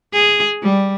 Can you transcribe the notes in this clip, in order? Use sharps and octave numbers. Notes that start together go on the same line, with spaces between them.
G#4
G3